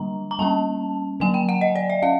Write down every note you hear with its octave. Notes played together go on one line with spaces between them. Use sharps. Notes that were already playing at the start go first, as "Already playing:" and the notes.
Already playing: D3 G3 A#3 D4 A#5
A#5
G3 A#3 C#4 A5
D3 F#3 A#3 G#5
G5
F#5
D#5
D5
E5
C#4 F5